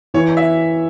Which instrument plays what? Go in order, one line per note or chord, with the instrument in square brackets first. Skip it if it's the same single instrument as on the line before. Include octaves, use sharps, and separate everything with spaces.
[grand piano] E3 [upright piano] C#5
[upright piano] E5